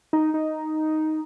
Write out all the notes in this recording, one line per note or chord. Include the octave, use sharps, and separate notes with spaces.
D#4
D#4